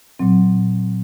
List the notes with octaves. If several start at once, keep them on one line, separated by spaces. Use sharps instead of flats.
A#2 F#3 C4